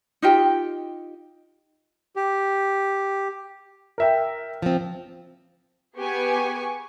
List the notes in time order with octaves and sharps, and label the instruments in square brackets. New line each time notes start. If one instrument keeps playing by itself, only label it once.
[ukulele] D#4 F4 G4 G5
[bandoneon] G4
[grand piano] A#4 E5 G5
[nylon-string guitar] F3 C4
[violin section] B3 G4 G#4 B4 G#5 C#6